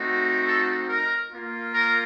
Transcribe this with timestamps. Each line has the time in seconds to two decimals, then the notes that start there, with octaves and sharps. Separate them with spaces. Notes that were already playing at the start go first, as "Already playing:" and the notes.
Already playing: A3 C4 D#4 F#4
0.47 A4
0.89 A#4
1.31 A#3 F4
1.73 A#4